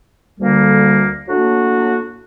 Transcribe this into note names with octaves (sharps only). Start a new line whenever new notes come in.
D2 D3 G3 A#3
A2 F#3 A#3 D4 F#4